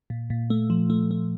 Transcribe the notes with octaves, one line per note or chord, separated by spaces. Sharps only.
A#2
A#2
A3
F3
A3
A3